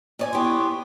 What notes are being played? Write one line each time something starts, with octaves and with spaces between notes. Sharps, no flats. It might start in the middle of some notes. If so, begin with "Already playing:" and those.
A#2 D5 G#5
B3 E4 G4 C6 C#6